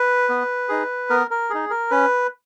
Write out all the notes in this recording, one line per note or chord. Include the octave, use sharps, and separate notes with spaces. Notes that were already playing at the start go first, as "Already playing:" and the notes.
Already playing: B4
B3
D#4 G#4
B3 A#4
A#4
D#4 G#4
A#4
C#4 B4